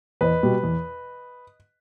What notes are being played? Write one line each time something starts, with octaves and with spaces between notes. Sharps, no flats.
E2 B4 D#5
B2 G3
E2